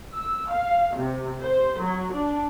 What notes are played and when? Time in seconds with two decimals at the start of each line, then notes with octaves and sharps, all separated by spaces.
0.14 E6
0.52 F5
0.97 C3
1.41 C5
1.80 F#3
2.13 D4